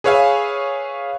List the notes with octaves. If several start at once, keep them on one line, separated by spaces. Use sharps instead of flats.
G#4 B4 C#5 E5 F5 G#5